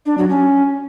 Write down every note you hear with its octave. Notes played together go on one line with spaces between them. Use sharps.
D4
F#3
C#4